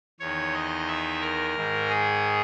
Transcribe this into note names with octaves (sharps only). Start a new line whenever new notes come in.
E2 C#5
D#3
D#5
E5
A#4
G#2 D#3
G#4